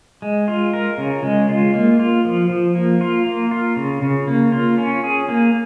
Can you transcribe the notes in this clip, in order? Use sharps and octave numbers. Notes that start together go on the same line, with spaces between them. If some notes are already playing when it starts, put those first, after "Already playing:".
G#3
F4
A#4
C#3
G#3
F4
A#3
F4
F3
F3
A#3
F4
A#3
F4
C#3
C#3
A#3
F4
C#4
G#4
A#3